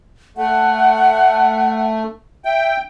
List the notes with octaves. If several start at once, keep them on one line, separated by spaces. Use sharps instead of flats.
A3 F#5
E5 G5